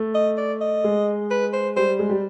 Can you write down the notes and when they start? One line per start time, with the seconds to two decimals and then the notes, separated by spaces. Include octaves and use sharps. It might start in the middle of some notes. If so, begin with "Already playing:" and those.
Already playing: A3
0.15 D#5
0.37 D5
0.61 D#5
0.84 G#3
1.30 B4
1.53 C5
1.76 G3 C5
1.99 G#3
2.09 G3